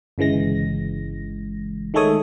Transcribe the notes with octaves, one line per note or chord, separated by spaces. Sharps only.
G1 C#3 E3 G#3 A#6
D#3 G#3 A3 A4 C#5 D#6